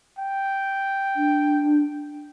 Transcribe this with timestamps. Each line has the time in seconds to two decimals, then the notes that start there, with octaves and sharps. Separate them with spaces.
0.19 G5
1.16 D4